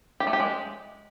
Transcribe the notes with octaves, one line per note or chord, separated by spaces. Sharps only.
G4
A3
G4
G#3